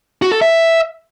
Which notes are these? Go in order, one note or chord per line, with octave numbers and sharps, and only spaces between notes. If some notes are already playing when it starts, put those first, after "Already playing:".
F#4
A4
E5